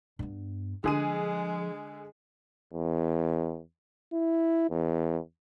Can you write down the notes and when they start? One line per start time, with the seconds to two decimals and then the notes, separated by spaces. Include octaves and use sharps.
0.19 G2 B3
0.84 D3 F3 G#3 G#4 D#7
2.73 E2
4.13 E4
4.70 E2